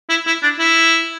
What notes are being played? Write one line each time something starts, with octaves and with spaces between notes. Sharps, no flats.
E4
E4
D4
E4